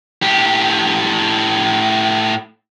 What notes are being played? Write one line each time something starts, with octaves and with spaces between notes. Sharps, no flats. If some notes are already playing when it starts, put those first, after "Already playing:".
A2 G4